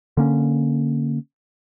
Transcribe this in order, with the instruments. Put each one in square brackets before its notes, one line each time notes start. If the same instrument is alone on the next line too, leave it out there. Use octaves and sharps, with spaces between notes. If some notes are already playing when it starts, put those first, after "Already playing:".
[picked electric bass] D3 A#3 C#4